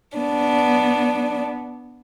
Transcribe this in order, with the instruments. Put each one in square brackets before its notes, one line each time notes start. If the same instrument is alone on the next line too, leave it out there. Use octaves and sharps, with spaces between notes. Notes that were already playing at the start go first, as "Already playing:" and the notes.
[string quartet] B3 D4